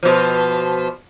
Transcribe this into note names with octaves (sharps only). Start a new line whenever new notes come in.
B2 F3